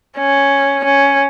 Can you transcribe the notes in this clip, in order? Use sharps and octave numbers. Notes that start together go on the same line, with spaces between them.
C#4
C#4